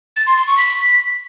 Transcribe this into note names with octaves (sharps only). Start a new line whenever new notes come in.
A6
C6
C6
C#6
B6